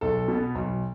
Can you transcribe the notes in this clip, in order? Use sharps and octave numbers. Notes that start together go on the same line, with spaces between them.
B1 A4
B2 B3
B1